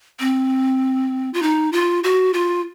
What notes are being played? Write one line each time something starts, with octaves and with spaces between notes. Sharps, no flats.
C4
F4
D#4
F4
F#4
F4